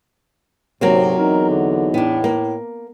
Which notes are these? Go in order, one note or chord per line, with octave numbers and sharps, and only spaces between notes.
D2 G#2 C3 F#3 A#3 C4
E2 D#4 A#4
D3
A2 B3 D4
A#3